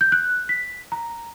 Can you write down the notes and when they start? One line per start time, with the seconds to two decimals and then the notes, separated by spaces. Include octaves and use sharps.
0.01 G6
0.12 F#6
0.49 B6
0.92 A#5